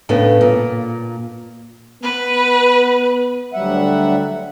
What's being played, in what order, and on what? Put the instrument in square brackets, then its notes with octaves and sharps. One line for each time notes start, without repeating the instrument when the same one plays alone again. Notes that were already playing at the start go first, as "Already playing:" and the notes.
[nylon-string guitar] A2 C#3 B3 D4 A4
A#2
[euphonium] B3 [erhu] B4
[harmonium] D2 F#3 G3 E5 F#5